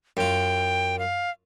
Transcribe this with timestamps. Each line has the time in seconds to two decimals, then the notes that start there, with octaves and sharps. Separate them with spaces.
0.17 F#2 F4 G5
0.99 F5